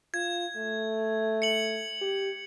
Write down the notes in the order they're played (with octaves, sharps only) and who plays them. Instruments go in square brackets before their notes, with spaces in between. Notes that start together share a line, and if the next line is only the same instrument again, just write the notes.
[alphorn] F4 [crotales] G#6
[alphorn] A3
[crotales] C#7 F#7
[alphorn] G4